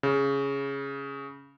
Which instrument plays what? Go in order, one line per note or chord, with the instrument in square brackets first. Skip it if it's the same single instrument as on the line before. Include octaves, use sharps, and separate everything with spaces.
[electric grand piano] C#3